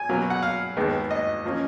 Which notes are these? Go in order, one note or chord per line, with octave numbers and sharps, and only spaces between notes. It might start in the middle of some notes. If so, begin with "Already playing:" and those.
Already playing: G#5
B2 F#3 A#3
F#5
F5
D#2 D#3 G#3 B3
D#5
F3 A#3 C#4